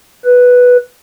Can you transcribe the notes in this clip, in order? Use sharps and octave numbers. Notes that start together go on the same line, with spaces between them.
B4